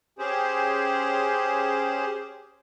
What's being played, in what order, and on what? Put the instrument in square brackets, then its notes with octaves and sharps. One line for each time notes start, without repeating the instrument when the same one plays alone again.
[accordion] C#4 G4 G#4 C5